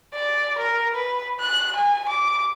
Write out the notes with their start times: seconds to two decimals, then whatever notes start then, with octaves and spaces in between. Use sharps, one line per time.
0.14 D5
0.58 A#4
0.95 B4
1.40 F#6
1.76 G#5
2.09 D6